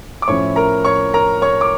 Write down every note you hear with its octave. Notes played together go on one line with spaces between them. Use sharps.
D6
A2 F3 C#4 E4 C#5 C#6
A#4 A#5
C#5 C#6
A#4 A#5
C#5 C#6
D6